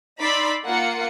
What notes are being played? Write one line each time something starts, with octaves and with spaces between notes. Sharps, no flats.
D#4 D5 B5 C6 E6
A#3 F4 F#5 C#7